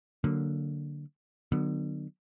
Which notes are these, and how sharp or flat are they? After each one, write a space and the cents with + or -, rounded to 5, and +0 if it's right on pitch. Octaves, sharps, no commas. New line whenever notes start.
D3 +0 F#3 +0 A#3 -10
D3 +40 F#3 +0 B3 +0